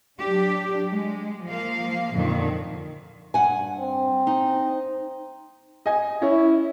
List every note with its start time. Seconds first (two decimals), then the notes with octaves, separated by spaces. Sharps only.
0.18 F#3 D4 G4
0.90 G#3
1.47 F3 A#3 F5
2.16 F2 A#2 D3 D#3
3.34 G2 F#5 G#5
3.80 C4
4.27 D#4
5.86 D#5 G#5
6.22 C#4 E4